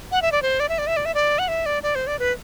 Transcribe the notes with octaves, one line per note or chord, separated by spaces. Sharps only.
F#5
E5
D5
C5
D5
E5
D5
E5
D5
E5
D5
F#5
E5
D5
D5
C5
D5
B4